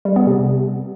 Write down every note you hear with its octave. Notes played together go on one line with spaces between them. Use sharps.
G3
B3
C3